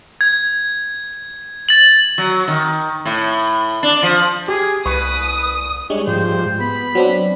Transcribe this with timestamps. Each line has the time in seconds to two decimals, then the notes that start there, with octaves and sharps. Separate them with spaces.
0.21 G#6
1.69 A6 F#7
2.18 F#3
2.48 D#3
3.05 A2
3.83 D4
4.03 F3
4.48 G4 G#4
4.86 C2 B4 C#6 D#6
5.90 G3 G#3 D4 C#5
6.07 G#2 F3 G4 C5
6.60 B3 B5
6.95 F#3 C4 D4